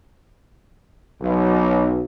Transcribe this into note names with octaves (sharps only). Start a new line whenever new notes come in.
B1